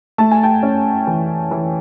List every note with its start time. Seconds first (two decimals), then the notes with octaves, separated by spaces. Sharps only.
0.18 A3 A5
0.31 G#5
0.43 G5 A5
0.63 C#4
1.07 E3
1.51 E3